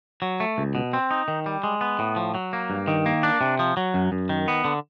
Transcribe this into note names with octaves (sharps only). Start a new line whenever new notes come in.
F#3
A3
C#2
B2
C4
D#4
D#3
G3
G#3
B3
A2
F3
F#3
A#3
G2
D#3
A#3
D4
C3
F3
F#3
F#2
F#2
D#3
B3
D3